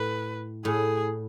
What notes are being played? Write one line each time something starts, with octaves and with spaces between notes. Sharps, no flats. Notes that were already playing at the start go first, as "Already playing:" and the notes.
Already playing: A2 B4
A2 G#4